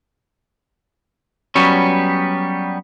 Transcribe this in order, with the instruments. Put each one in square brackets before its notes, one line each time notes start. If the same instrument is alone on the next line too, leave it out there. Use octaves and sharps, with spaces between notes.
[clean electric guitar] F#3 G3 B3 C#4